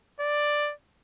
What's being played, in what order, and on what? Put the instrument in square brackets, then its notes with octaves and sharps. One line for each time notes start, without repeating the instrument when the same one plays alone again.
[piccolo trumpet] D5